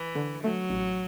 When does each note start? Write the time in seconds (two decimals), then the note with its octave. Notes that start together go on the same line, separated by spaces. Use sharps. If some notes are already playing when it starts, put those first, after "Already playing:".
Already playing: E3
0.15 D3
0.43 F#3 A3
0.70 A1